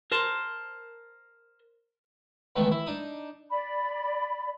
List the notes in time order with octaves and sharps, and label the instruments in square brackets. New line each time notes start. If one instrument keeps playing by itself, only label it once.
[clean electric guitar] A#4 C5 A5 C6
[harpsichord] C#2 D#3 E3 A3 B3
E4
D4 D#4 D#6
[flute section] D5 B5